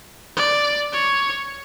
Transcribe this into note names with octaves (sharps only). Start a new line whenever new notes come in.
D5
C#5